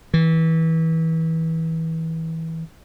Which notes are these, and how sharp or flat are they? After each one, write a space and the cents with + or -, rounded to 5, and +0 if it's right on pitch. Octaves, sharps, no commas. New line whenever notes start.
E3 -25